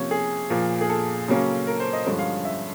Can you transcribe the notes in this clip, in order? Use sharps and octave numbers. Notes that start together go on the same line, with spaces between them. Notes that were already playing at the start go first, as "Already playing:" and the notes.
Already playing: C3 F3 A#3 C#4 C#5
G#4
A#2 F3 A#3
G#4
A4
C#3 F#3 A#3 C#4
A#4
C5
D#5
G2 D3 F3 G#3 C#4
F5
E5